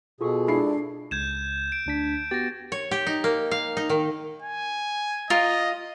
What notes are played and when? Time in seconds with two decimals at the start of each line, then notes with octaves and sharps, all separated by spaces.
0.21 B2 F4 G#4 A4 C#6
0.47 G#3 D4 E4 C7
1.11 C#2 G6 G#6 E7
1.72 D7
1.86 D2 D4 B6
2.31 B3 F#4 G4 A6 A#6
2.72 C#5
2.91 G4
3.07 D#4
3.24 A#3
3.51 F5
3.77 D#4
3.90 D#3
4.42 G#5
5.30 F4 A#4 D#5